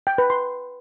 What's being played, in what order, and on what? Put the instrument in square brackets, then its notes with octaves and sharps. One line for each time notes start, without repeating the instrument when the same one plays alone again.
[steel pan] G5
B4
C6